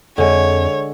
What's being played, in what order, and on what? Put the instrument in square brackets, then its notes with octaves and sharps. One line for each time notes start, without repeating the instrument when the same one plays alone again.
[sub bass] F2 [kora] D3 G#3 [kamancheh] C#5